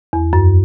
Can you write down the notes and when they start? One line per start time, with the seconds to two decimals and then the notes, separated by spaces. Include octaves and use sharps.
0.13 E2
0.33 F#2